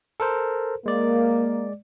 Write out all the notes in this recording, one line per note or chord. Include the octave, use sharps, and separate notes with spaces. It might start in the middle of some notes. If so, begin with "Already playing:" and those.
A4 A#4 C5
G#3 A#3 D5